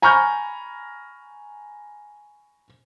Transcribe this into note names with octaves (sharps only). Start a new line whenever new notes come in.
G#5 A#5 B5 C#6 F6 G6